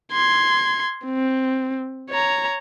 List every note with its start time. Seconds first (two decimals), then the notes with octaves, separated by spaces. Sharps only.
0.12 C6 G#6
1.05 C4
2.10 C#5 A#5